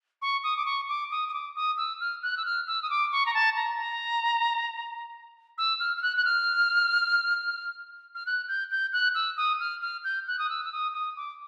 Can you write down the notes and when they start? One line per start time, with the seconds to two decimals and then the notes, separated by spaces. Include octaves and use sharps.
0.22 C#6
0.43 D#6
0.56 D6
0.65 C#6
0.88 D6
1.11 D#6
1.28 D#6
1.33 D6
1.56 D#6
1.77 E6
2.00 F6
2.22 F#6
2.37 E6
2.45 F6
2.67 E6
2.82 D#6
2.90 D6
3.12 C#6
3.26 A#5
3.34 A5
3.56 A#5
3.78 A#5
5.58 E6
5.80 F6
5.97 F6
6.02 F#6
6.17 F#6
6.25 F6
8.15 F6
8.26 F#6
8.48 G6
8.71 G6
8.92 F#6
9.15 E6
9.37 D#6
9.60 F6
9.81 F6
10.04 G6
10.27 F#6
10.39 D#6
10.49 E6
10.64 E6
10.72 D#6
10.94 D#6
11.16 D6